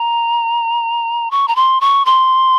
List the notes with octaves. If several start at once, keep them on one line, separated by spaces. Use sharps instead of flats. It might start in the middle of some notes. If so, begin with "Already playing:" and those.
Already playing: A#5
C#6
A#5
C6
C#6
C6